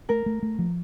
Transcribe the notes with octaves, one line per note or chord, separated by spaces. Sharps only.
A3 A#4
A3
A3
F3